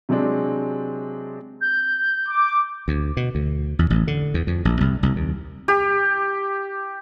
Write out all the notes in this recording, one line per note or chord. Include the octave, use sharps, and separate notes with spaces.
C3 F#3 G#3 C4 D4
G6
D6
D2
B2
D2
E2
A1
D3
E2
F2
A#1
C2
C2
D#2
G4